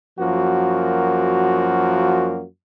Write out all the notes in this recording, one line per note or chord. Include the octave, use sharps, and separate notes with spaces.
F#2 F3 A#3 F#4